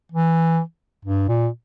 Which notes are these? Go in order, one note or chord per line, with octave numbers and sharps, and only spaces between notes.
E3
G2
A#2